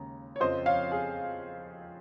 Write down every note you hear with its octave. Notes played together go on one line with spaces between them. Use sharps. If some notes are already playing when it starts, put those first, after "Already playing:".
Already playing: D#2 C#3 G#3 A#5
C#5
F2 C#3 F3 C4 C5 D#5
C#5 F5
G#4